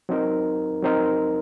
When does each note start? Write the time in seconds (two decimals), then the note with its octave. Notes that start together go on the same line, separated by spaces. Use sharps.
0.09 F#3 C4 D#4 A#4
0.83 F#3 C4 D#4 A#4